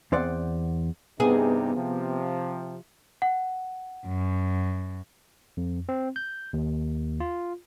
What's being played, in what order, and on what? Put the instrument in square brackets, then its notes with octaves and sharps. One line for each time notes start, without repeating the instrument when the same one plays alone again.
[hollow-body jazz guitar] E2 C4 C5 D5 F#5
[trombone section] G2 C3 D#4 [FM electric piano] B3 [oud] G#4
[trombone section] C3 F3
[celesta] F#5
[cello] F#2
[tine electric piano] F2
C4
G6
D#2
F4